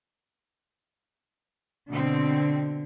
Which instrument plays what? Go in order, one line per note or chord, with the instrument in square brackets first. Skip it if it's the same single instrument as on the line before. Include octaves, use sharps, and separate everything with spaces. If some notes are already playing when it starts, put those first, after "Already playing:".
[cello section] B2 C4 [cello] D3